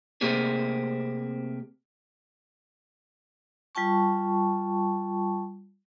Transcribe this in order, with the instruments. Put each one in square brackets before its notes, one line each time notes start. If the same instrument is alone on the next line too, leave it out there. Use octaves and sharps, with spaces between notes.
[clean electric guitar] C3 A3 A#3 C4 G4 G#4
[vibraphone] G3 F4 G5 A5 C#6